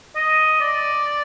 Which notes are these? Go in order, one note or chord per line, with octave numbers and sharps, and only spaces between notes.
D#5
D5